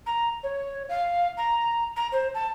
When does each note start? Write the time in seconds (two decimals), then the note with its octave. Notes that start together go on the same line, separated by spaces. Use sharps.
0.06 A#5
0.43 C#5
0.89 F5
1.37 A#5
1.96 A#5
2.12 C5
2.34 A5